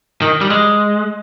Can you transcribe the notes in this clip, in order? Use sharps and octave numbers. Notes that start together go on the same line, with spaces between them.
D#3
G3
G#3